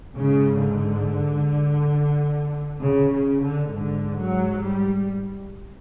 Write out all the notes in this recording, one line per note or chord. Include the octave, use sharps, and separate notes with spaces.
G#2 C#3
D3
C#3
C#3
D3
G#2 D3
F#3
G3